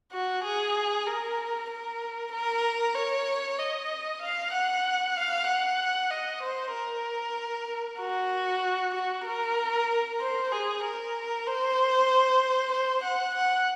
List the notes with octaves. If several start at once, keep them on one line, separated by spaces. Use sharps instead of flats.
F#4
G#4
A#4
A#4
A#4
C#5
D#5
F5
F#5
F5
F#5
D#5
C5
A#4
F#4
F#4
A#4
C5
G#4
A#4
C5
C5
F#5
F#5